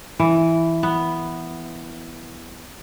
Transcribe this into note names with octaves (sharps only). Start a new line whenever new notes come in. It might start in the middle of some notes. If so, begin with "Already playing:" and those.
E3
B3